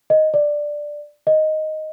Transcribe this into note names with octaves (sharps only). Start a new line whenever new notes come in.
D#5
D5
D#5